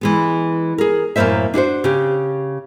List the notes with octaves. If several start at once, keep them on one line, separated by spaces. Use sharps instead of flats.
E3 G#3 B3
G#4 A#4
F#2 A2 A3 A#3 C5 E5
D4 E4 F#4 C5
C#3 G4